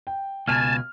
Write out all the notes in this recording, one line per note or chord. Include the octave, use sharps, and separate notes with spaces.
G5
C#2 B2 G#5 A5 F6